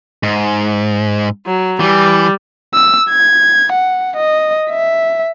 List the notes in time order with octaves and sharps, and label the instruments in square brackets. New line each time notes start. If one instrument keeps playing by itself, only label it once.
[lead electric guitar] G#2
[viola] F#3
[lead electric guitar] E3 [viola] G3
[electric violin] E6
G#6
F#5
D#5
E5